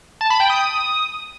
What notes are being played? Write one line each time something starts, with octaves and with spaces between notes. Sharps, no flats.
A5
B5
G5
D#6